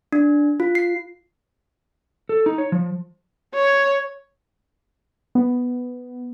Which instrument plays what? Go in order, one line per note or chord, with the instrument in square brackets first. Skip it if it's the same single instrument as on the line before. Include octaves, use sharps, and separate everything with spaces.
[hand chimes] D4
F4
C7
[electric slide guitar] A4
D#4
C#5
F3
[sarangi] C#5
[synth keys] B3